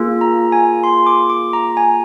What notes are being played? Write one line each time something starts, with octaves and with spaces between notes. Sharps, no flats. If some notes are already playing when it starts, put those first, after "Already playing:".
Already playing: A#3 F4 G#4
A#5
G#5
C6
D6
D6
A#5
G#5